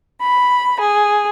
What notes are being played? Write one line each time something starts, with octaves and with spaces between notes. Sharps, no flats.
B5
G#4